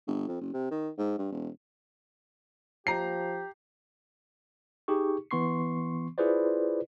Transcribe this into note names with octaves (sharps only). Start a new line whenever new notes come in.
G1
F2
F#1
C3
D#3
G#2
G2
E1
F3 G4 A#5 C7
D#4 G4 G#4 C#6
E3 B3 C6 C#6 C7
E4 F4 G#4 B4 C5 D5